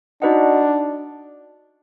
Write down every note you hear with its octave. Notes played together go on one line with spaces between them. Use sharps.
D4 D#4 F#4 B4 D#5 F#5